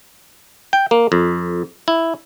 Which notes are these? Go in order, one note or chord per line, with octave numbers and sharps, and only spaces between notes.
G5
A#3
F2
E4